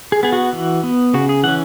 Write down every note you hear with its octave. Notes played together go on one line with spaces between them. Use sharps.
G#4
B3 G#4
F#4
E3
B3
C#3 F#4
G#4
E3 C#4 F#5